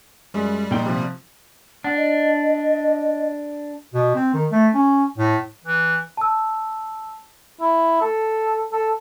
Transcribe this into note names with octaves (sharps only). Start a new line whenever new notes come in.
F#2 G3 G#3
A#1 A#2 D#4 G5
C3 F3
D4 F#5
D#5
B2
C4
D#3
A3
C#4
A2
E3
A5 E6
E4
A4
A4